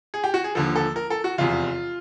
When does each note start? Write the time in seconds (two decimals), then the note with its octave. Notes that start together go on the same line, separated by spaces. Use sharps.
0.14 G#4
0.24 G4
0.34 F#4
0.44 G#4
0.55 D#2 D3 F3 A4
0.75 A4
0.96 A#4
1.10 A4
1.24 F#4
1.38 F1 E2 C3 F4